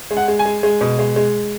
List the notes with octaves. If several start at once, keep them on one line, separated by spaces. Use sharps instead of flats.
G#3
F#5
G#3
G#5
G#3
G#3
B2
G#3
G#3